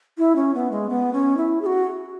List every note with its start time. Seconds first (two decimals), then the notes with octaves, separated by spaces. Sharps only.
0.18 E4
0.35 C#4
0.54 B3
0.71 G#3
0.89 B3
1.13 C#4
1.37 E4
1.61 G#4
1.66 F#4